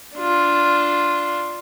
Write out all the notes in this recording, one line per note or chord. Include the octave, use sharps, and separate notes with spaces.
D4 F4